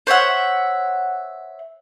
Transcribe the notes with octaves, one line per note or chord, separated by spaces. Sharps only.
C5 C#5 E5 F#5